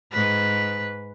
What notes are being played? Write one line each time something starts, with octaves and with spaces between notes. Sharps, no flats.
G#2 B4